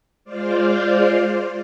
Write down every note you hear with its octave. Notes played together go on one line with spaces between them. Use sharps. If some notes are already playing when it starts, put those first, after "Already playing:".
G#3 F4 C5 D5 F5